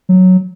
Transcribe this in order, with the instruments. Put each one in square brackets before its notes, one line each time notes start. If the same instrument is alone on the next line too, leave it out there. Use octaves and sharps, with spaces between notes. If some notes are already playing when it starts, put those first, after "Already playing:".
[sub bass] F#3